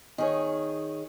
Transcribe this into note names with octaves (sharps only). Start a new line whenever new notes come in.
D#3 G#4 C#5